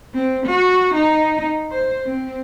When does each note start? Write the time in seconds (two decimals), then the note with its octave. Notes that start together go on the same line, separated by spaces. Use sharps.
0.14 C4
0.46 F#4
0.94 D#4
1.71 C5
2.06 C4